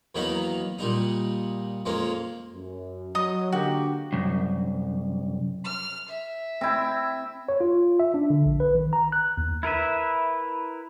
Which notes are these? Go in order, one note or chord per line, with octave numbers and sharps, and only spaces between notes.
E2 D#3 F#3 A#3 D#4 B5
A#2 G3 D#4
F2 G#3 A#3 C#4
F#2
F#3 D#5 D#6
D3 A#3 F#4 G4
C2 F#2
F6
E5
C4 E4
C#5
F4
E5
D4
D3
A#1
B4
D#3
A#5
F#6
D#2
E4 A#4 B4 E5